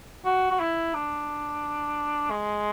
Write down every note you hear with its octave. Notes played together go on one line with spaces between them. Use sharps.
F#4
F#4
E4
D4
G#3